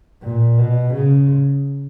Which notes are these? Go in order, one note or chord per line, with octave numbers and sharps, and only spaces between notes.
A#2
B2
C#3